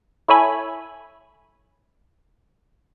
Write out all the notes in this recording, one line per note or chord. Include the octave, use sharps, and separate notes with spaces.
E4 A4 C#5 E5 G#5 B5